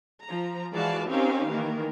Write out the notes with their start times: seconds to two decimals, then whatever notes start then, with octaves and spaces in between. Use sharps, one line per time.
0.25 F3 A#5
0.74 E3 G#3 F#4 D5 F5 A5
1.09 C4 C#4 D#4 G4 A#4 F5
1.49 D#3 E3 A#3 A#4